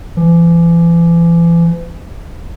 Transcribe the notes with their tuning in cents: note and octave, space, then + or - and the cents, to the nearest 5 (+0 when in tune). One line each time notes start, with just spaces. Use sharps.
E3 +40